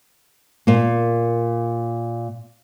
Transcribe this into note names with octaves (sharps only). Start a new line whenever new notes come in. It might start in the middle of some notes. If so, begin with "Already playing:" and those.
A#2 A#3